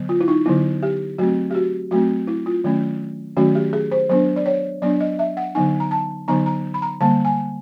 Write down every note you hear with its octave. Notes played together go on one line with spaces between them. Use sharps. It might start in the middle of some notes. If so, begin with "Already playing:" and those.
Already playing: D3 F#3 B3
F4
E4
D#4
D3 F#3 B3 E4
G4
F#3 A3 C4 F#4
G4
F#4
F#3 A3 C4 F#4
E4
F4
D#3 F#3 A3 C#4
D#3 F#3 A3 C#4 F#4
G4
G#4
C5
F#3 B3 D4 C5
D5
C#5
F#3 B3 D4 D5
D#5
E5
F#5
D3 F#3 B3 D#4 G#5
A#5
A5
D3 F#3 B3 D#4 A#5
A#5
B5
A#5
D3 G3 A#3 A5
G#5